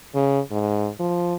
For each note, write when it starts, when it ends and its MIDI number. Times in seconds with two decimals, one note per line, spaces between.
0.15 0.40 49
0.51 0.90 44
1.00 1.35 53